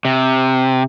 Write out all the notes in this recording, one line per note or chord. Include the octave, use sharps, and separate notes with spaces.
C3